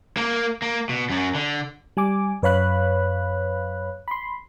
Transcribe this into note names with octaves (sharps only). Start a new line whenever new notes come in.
A#3 A#4
A#3
B2
F#2 F#3
D3
G3 G#5 D6
F#2 B4 C#5 F5 B5 F#6
B5 C6